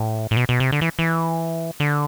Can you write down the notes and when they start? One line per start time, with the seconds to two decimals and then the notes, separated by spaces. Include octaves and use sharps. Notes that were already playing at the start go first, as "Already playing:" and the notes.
Already playing: A2
0.31 A2
0.37 B2
0.49 B2
0.60 C3
0.72 D3
0.81 E3
0.99 E3
1.80 D3